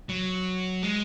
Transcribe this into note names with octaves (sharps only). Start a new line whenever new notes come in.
F#3
G#3